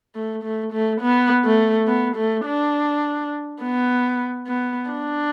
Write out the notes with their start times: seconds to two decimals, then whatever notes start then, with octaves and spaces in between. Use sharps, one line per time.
0.15 A3
0.43 A3
0.73 A3
1.01 B3
1.44 A3
1.87 B3
2.17 A3
2.46 D4
3.61 B3
4.47 B3
4.90 D4